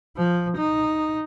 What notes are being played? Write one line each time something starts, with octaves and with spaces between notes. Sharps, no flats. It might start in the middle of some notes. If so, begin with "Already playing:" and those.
F3
D#4